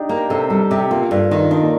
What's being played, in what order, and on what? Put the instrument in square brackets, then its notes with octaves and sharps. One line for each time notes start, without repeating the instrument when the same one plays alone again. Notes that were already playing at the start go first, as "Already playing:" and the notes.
Already playing: [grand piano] D4 D#4 G4
[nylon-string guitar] A#3 [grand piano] A#4
[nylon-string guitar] C3 [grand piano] A4
[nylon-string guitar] G3 [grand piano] A4
[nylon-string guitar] C3 [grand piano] G4
[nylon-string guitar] A#3 [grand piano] F4
[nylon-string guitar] G2 [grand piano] A4
[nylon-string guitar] D#3 [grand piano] F4
[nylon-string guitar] D4 [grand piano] D#4
[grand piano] A#3